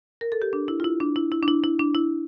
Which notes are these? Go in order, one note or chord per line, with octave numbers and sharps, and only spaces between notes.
A#4
A4
G4
D4
E4
F4
E4
D4
E4
E4
D4
E4
E4
D4
E4